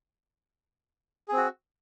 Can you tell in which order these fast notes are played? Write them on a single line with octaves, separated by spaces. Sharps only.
G#4 C4 F#4